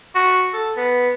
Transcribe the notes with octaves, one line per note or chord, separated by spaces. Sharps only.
F#4
A4
B3